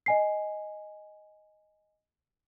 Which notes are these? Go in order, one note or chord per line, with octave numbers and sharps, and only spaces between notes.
D#5 G#5 C7